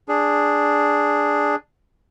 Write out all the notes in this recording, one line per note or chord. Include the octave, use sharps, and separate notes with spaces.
D4 G#4